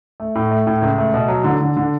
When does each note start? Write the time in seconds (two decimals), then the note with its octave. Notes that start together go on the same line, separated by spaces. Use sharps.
0.20 A3
0.35 A2
0.51 A3
0.67 A2
0.82 C#2
0.98 A3
1.14 B2
1.28 F#3
1.44 D3
1.60 D3
1.77 D3